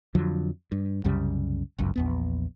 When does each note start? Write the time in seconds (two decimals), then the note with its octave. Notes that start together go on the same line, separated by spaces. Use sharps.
0.15 F2 D3 F3 F#3
0.72 G2
1.04 C2 F#2 C#3 G3
1.78 G1 C#2 F#2
1.96 A#1 E2 B3